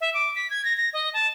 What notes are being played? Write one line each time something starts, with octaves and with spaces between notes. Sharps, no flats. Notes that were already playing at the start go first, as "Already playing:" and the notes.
E5
D6
B6
G#6
A#6
A#6
D#5
A5